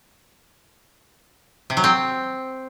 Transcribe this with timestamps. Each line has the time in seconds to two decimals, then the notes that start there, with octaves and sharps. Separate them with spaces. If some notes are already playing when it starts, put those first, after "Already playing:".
1.70 C3
1.77 F#3
1.84 C4